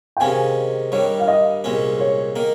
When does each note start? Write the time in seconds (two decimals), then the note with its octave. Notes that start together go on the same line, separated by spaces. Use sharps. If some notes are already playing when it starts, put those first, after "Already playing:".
0.17 G5
0.20 C3 D#3 G#3 C#4 F5 G#5
0.92 G2 D#3 G3 C#5
1.20 F5
1.28 D#5
1.64 C2 A#2 G#3 C#4
2.00 C#5
2.36 D#3 A#3